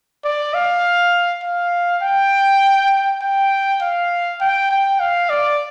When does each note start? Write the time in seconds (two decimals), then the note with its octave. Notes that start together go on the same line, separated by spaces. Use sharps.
0.24 D5
0.54 F5
1.43 F5
2.03 G5
3.22 G5
3.81 F5
4.41 G5
4.71 G5
5.00 F5
5.30 D5